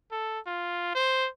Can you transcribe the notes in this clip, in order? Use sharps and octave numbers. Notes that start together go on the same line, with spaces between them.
A4
F4
C5